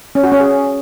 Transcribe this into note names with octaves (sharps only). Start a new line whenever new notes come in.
C#4
F#4
C#4
G#4